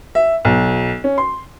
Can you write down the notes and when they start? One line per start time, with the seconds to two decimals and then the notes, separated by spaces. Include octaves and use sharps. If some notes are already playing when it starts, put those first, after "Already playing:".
0.15 E5
0.45 B1
1.04 C#4
1.18 C6